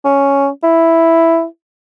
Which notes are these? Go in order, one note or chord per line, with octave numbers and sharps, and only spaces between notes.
C#4
E4